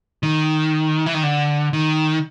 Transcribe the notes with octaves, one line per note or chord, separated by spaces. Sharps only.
D#3
E3
D#3
D3
D#3